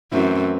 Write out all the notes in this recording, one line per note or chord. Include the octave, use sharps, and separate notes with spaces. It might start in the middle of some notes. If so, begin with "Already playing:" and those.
F#2 E3 A3 C4 E4